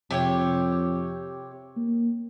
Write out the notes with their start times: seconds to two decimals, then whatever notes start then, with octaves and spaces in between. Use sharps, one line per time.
0.11 F2 C3 G4 C#5
1.77 A#3